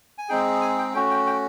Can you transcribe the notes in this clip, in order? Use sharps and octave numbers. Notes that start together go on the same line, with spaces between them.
G#5
G#3 C4 D#4 G#4 G5
G#5
G5
A3 C#4 F#4 G5
G5
G5